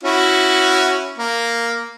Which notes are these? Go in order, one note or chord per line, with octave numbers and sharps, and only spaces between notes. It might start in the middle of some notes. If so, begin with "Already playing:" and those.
C#4 E4 F#4
A#3